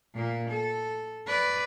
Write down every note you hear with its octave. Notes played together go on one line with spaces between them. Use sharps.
A#2 A#3
A4
B4 D5